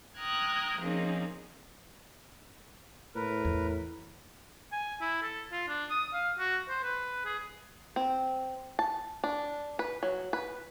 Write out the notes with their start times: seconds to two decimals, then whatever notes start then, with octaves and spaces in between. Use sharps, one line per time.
0.17 G5 A#5 D#6 F6 F#6 G#6
0.80 F3 A#3 C4 C#4 D#4 G#4
3.15 A2 A#4 B4
3.45 E2
4.72 G#5
5.01 E4
5.22 A4
5.52 F4
5.68 D4
5.90 D#6
6.13 F5
6.39 F#4
6.69 C5
6.83 B4
7.25 G#4
7.96 C4
8.79 A5
9.24 D4
9.79 B4
10.03 F#3
10.33 B4